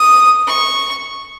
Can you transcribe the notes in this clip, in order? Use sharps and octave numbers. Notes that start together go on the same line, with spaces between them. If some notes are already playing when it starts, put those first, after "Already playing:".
Already playing: D#6
C#6